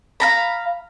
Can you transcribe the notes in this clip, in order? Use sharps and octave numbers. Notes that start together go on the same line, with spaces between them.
F5 A#5 B5